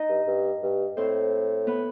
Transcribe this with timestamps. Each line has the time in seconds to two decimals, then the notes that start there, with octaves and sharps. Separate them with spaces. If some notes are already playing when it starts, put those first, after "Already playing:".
Already playing: D#4 D#5
0.09 G2
0.27 G2
0.62 G2
0.97 A2 C4 C5
1.67 B3 B4